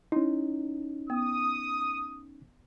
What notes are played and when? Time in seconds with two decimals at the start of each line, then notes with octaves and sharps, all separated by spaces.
0.12 C#4 D#4 E4
1.10 B3 D#6